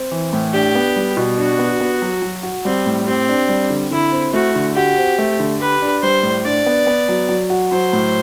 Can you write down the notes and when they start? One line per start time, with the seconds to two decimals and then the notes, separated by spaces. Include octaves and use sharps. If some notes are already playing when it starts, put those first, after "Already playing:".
Already playing: C4
0.12 E3
0.33 A2
0.53 D4 G4
0.75 B3
0.96 G3
1.17 B2
1.38 D4 F#4
1.59 B3
1.81 B3
2.02 F#3
2.22 F#3
2.43 F#4
2.65 G3 C4
2.86 A2
3.06 C4 G4
3.29 D4
3.49 G3
3.70 D3
3.91 D3 E4
4.12 C4
4.33 A3 F#4
4.55 D3
4.75 F#4 G4
4.98 C4
5.19 A3
5.40 D3
5.60 G4 B4
5.82 D4
6.02 G3 C5
6.23 A2
6.44 D4 D5
6.66 B3
6.87 B3
7.09 F#3
7.29 F#3
7.50 F#4
7.72 F#3 C5
7.93 A2